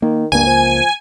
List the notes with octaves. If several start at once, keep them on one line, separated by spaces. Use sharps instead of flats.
D#3 A#3
C#2 G2 A#3 G#5
F3